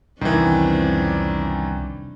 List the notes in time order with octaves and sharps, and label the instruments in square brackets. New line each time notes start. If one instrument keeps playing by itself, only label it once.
[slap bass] C2 [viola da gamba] F2 C#4 D4 [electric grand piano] D#3 E3